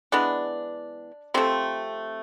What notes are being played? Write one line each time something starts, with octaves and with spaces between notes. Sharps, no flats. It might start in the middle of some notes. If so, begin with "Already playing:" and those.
E3 G#3 B3 D4
C3 F3 A3 C4